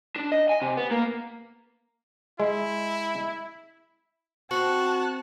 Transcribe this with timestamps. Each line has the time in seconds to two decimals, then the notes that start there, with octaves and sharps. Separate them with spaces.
0.16 D4
0.32 D#5
0.49 G#5
0.62 C3
0.77 B3
0.91 A#3
2.40 G#3 E4
4.51 C4 F#4 A5 F#6